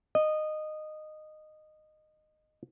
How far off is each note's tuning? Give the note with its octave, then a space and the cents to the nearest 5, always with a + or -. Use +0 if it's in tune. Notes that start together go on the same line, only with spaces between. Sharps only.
D#5 -15